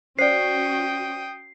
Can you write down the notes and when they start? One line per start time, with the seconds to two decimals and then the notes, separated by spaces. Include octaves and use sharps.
0.19 C#4 F#4 C5 D5 G5 D#6 C7